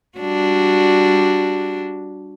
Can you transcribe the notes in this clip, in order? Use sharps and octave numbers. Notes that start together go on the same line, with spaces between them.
G3 D4 F#4